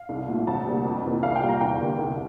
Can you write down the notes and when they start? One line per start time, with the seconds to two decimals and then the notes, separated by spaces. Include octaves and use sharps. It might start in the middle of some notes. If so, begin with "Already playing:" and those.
Already playing: F5
0.09 C2
0.28 A#2 A3
0.47 D2 A5
0.66 C3 G3 A#3
0.85 F2
1.04 C3 E3 A#3
1.23 C2 F5
1.36 G5
1.42 A#2 G3
1.49 A#5
1.61 E2 G5
1.80 D3 G3 A#3
1.98 C2